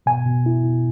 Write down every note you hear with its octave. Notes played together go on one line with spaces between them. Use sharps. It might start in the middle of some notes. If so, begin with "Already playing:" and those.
B2 G#5
B2
E4
B2